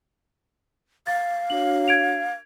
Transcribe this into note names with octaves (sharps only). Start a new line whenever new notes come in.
F5 A6
D4 F#4 C#5 F#7
G#6 D7 F7